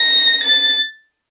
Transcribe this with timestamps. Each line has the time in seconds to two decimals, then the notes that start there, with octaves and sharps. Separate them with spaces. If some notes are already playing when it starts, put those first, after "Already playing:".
Already playing: A#6
0.43 A6